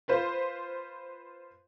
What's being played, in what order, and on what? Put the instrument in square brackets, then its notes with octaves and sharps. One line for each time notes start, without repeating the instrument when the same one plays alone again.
[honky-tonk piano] F4 B4 C5